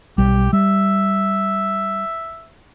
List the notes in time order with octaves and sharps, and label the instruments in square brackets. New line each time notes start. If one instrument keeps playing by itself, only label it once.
[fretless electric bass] B1 G3 [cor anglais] G4
[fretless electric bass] G3 [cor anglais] E5